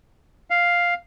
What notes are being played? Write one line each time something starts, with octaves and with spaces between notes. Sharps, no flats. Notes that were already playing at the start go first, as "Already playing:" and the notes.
F5